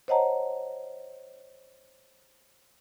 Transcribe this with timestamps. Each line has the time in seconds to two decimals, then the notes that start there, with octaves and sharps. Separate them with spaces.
0.08 C5 C#5 D#5 F#5 A5 A#5